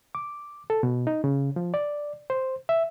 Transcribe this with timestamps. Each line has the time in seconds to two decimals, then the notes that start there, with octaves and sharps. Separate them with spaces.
0.15 D6
0.70 A4
0.83 B2
1.07 D#4
1.24 C#3
1.56 F3
1.74 D5
2.30 C5
2.69 E5